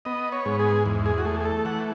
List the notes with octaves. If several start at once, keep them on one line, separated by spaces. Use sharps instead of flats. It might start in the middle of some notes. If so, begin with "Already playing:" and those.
B3 D#5
C#5
G#2
G#4
E2
G#4
F#4
A3 G#4
G#4
A4
E3 F#5